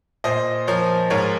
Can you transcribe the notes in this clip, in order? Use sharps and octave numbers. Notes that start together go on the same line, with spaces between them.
A#2 C5 D#5
F3 A#4 C#5
G#2 A#4 C#5